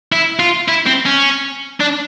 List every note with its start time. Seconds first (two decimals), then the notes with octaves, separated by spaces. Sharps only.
0.12 E4
0.39 F4
0.68 E4
0.86 C4
1.06 C#4
1.80 D4